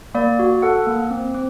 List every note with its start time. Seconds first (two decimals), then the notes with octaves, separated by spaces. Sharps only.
0.15 A#3 D5
0.39 F#4
0.62 A4 F#5
0.87 A#3
1.11 C4
1.34 C4